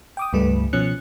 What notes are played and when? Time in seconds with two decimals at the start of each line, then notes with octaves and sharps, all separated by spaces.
0.17 G5 D6 D#6
0.33 C#2 G2 G3 A3 B4
0.73 B2 F3 C#4 F#6 C#7